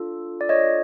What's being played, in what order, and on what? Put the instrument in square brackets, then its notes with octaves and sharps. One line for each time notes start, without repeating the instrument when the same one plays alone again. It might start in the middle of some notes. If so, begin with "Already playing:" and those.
Already playing: [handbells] D4 F4 A4
D5
C#5 D#5